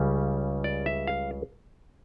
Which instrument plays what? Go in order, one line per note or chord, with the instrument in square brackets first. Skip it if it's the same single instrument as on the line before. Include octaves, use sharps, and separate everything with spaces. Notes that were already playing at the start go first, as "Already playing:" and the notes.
Already playing: [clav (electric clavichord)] C#2 C#3 G3 C#4
D5
E5
F5